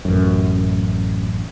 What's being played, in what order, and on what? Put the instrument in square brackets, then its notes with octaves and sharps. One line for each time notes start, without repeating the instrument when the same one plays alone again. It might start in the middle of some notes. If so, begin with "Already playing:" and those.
[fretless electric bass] A1 F#2